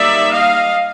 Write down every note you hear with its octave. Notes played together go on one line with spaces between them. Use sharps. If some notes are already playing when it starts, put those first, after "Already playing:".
Already playing: G3 A#3 D#4 D5 E5
D#5 F5